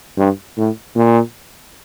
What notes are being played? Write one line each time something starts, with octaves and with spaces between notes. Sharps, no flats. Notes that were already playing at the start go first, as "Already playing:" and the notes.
G2
A2
A#2